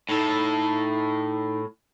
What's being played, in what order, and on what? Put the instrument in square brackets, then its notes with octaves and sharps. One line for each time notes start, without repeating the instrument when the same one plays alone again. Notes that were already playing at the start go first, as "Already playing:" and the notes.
[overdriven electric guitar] A2 A4 [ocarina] D#4